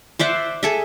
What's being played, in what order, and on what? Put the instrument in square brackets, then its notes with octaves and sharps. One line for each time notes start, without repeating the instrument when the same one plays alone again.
[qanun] C5 D5 E5 F#5
G#4 A4 E5